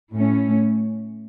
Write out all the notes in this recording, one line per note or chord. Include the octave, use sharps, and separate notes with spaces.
A2 A3 C#4